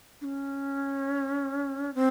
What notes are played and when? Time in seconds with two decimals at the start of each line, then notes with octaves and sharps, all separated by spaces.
0.21 D4
0.25 C#4
1.95 C4